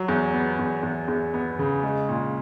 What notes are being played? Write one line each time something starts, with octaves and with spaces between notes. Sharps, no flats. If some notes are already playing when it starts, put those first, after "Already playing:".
Already playing: F#3
E2
B3
E2
E2
E2
B3
C#3
G#3
A#2